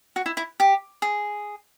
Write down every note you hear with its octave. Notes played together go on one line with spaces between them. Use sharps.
F#4
E4
E4
G4
G#4